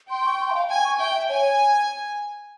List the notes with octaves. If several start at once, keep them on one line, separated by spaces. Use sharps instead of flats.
G5 C6
C#6
C6
E5
F5
G5 G#5
C#6
E5 G5
E5
C#5 G#5